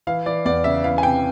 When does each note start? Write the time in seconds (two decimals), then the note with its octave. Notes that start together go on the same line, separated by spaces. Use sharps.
0.07 E3 F5
0.26 E3 D5
0.45 E2 D5
0.64 C#3 E5
0.84 E3 F5
0.98 G#5
1.03 C3 G5